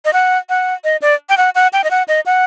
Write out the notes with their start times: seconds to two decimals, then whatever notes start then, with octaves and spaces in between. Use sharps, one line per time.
0.05 D#5
0.13 F#5
0.49 F#5
0.84 D#5
1.02 D5
1.29 G5
1.37 F#5
1.55 F#5
1.73 G5
1.84 D#5
1.91 F#5
2.08 D#5
2.26 F#5